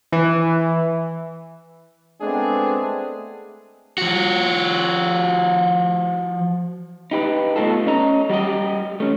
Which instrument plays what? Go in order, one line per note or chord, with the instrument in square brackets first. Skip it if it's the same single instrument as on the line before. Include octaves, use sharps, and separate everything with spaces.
[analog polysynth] E3
[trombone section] G#3 A3 B3 C4 D4 G#4
[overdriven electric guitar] F3 F#4
[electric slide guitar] D#4 G4 B4
A3 B3 D#4 F4 A4
C#4 D#5 A#5
G3 F#4 G4 D#5
A3 C#4